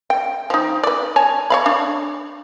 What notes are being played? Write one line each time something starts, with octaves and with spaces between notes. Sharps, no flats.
G5
F3 D#4
B4 D5
C#5 G#5 A5
C#5 F5 B5
D4